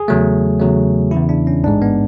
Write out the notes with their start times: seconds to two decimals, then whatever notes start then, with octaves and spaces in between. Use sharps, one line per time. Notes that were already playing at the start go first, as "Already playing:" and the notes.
Already playing: G#4
0.08 E2 C#3 F#3 A3
0.59 E2 C#3 F#3 A3
1.11 E2 C#3 E3 E4
1.29 D4
1.47 C#4
1.64 A1 G#2 G#3 D4
1.82 B3